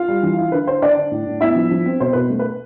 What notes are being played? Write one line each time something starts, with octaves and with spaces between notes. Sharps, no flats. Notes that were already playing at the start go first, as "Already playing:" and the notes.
Already playing: F4 F5
G3
E3
E4
D3 B4
D3 C5
D3 D4 D5
D3
A2
A2
B3 E4 E5
F3
F3
C4
B2 C5
B2 B4
A3
B4